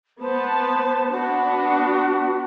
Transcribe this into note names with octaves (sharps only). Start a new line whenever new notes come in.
B3 C5 A5
B3 D4 F#4